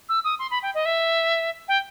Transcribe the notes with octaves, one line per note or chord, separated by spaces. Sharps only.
E6
D#6
C6
B5
G5
D#5
E5
G5